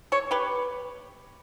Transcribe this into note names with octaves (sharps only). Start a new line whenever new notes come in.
A4 C#5
G4 B4